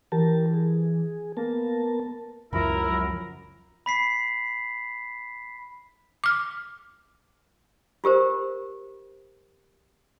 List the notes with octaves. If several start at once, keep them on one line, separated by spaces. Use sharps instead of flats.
E3 G4 A#4 A5
G#4
A#3 B3 A#4 A5
C#2 F#2 F3 E4 A#4 B5
B5 B6 C7
D6 F6
F4 G4 A#4 C5